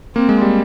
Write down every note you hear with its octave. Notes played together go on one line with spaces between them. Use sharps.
A#3 C4
G#3
G3